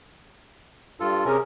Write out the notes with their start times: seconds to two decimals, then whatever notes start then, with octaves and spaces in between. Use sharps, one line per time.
1.00 G2 F4 A4
1.25 C3 C#4 G#4 A#4